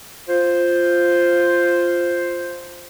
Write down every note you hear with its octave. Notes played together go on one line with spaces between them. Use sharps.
F4 C5